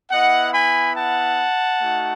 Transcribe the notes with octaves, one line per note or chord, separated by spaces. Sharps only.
B3 E4 D#5 F#5
G#5 B5
F#5 A5
A3 D#4 F#4